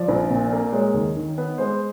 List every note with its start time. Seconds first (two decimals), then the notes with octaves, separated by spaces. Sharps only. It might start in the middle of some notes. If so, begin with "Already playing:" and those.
Already playing: F3 D5
0.08 A#1
0.30 A#2
0.52 A#3
0.73 G#3 C#5
0.94 D#2
1.16 D#3
1.38 B3
1.58 G#3 C5